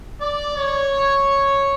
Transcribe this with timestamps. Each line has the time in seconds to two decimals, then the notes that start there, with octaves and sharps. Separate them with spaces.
0.21 D5
0.56 C#5